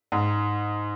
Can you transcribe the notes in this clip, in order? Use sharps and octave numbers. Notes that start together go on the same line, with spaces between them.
G#2